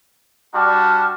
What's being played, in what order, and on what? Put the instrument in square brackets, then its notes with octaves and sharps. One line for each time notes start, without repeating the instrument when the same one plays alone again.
[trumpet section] G3 D4 F#4 [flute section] A5 F6